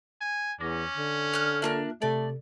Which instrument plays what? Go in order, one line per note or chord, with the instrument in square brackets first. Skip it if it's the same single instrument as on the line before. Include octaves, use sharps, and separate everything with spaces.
[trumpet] G#5
[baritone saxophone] E2 [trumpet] C#4 [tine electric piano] D6 A#6
[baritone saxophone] D3
[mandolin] F6 F#6
[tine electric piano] A#3 F4 E5 [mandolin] D4 A#4 F#6
[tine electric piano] C3 A4 [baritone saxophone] A3 [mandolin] D5